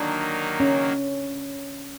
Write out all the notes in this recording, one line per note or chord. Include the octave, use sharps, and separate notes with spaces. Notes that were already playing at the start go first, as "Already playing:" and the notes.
Already playing: D#3 F#3 A#3 D4 D#4
C#4